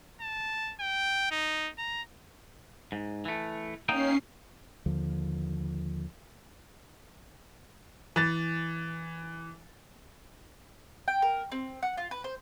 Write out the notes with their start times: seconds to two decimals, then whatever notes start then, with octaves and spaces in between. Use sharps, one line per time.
0.21 A5
0.80 G5
1.31 D#4
1.78 A#5
2.92 G#2
3.25 E3 A3
3.89 A#3 C#4 D#4 G5 C7
4.86 D#2 D3 F3
8.16 E3 A6
11.08 G5
11.22 A#4
11.52 C4
11.83 F#5
11.97 F4
12.11 B4
12.24 C5